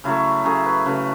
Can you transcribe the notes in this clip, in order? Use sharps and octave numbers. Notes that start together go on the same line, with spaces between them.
C#3 F#3 A3 E4
C#3 F#3 A3 G#4
B4
C#3 F#3 A3 B4